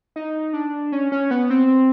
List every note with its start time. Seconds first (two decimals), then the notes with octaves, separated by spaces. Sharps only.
0.16 D#4
0.53 D4
0.92 C#4
1.12 C#4
1.31 B3
1.50 C4